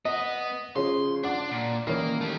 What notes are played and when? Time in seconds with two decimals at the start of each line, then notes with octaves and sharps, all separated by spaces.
0.05 B3 D#5
0.76 C#3 F3 C#4 C6
1.23 D4 D5 F#5 D6
1.51 A#2
1.87 D#3 E3 A#3 C#4
2.21 A3 G4